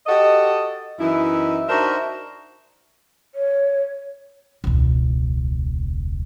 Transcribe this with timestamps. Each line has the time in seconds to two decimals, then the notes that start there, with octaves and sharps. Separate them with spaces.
0.07 F#4 G4 A4 D#5
0.99 F#2 E3 D#4 E4
1.69 D4 D#4 F#4 A#4 C5 E5
3.35 C#5
4.64 E1 C#2